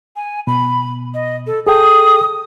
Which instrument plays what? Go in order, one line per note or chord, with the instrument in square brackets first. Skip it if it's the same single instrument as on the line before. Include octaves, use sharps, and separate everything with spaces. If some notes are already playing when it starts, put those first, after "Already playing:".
[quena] G#5
[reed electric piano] B2 [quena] B5
[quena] D#5
A4
[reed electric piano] G#4 A4 G5 [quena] D#6